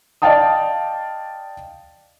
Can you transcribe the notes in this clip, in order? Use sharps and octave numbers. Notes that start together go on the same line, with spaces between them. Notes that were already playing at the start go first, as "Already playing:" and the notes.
D5 D#5 F5 G5 A5 D#6